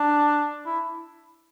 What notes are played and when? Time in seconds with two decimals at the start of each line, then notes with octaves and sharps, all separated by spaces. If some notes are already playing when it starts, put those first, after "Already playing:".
Already playing: D4
0.66 E4